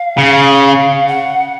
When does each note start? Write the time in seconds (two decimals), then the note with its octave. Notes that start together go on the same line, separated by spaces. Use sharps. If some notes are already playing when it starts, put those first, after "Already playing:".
Already playing: F5
0.18 C#3
1.08 F#5